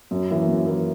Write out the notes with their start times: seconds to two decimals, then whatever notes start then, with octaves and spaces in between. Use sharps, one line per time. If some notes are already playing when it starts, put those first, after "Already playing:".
0.11 F#2
0.29 E3 A#3
0.48 F#2
0.66 E3 A#3